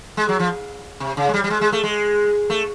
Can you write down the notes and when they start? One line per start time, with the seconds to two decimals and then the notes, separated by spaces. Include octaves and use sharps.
0.17 G#3
0.29 F#3
0.39 F3
1.00 C3
1.17 C#3
1.29 G#3
1.34 G3
1.44 G3
1.50 G#3
1.61 G#3
1.72 A3
1.83 G#3
2.50 A3